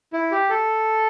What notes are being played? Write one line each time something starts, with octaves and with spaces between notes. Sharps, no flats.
E4
G4
A4